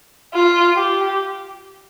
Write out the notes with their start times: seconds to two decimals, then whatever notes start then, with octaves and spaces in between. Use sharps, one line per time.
0.34 F4
0.76 G4